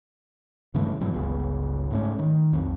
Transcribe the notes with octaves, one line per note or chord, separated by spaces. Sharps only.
G2 C#3 E3 A3
G2 B2 E3 F#3
G1 C#2 C#3 B3
G#2 A3 C#4
D#3
B1 F2